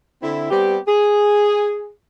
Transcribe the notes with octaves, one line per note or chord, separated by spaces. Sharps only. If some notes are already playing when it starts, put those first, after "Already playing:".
D3 C4 E4
G3 B3 C4 G4
G#4